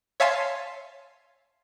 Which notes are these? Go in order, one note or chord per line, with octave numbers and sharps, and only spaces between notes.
C#5 E5 F5 G#5 A5 C6